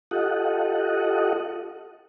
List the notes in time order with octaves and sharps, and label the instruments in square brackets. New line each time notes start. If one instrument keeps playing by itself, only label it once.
[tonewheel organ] F4 G4 A4 D#5 F#5